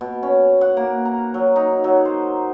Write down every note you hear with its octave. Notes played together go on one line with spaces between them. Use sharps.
B2
C#4
F#5
A#3
A#5
F#3
D#4
F#3
C5